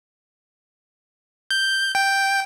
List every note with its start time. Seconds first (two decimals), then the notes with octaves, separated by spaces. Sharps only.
1.51 G6
1.95 G5